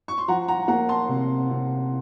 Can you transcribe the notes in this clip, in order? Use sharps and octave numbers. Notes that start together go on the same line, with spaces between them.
C#6
C6
F3 F#5 A#5
F#5 A#5
A#3 F#5 A#5
A5 C6
C3
C3